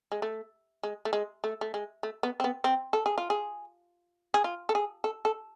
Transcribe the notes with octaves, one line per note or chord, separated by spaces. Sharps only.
G#3
A3
G#3
A3
G#3
A3
A3
G#3
A3
B3
C4
B3
C4
A4
G#4
F4
G#4
G#4
F4
A4
G#4
A4
A4